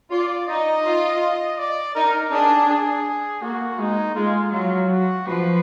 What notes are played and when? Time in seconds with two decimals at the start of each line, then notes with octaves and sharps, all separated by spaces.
0.11 F4 D5
0.48 D#4 D#5
0.85 F4
1.58 D5
1.95 D#4 A#4
2.32 D4 G#4
2.69 G#4
3.42 A#3 F#4
3.79 G#3 D#4
4.15 G#3 F4
4.52 F#3 F4
4.89 F#4
5.26 F3 B4